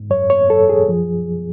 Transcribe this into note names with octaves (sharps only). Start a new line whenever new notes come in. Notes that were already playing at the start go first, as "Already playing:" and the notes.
Already playing: G#2
F#2 C#5
C#5
F#2 A4
G#4
F3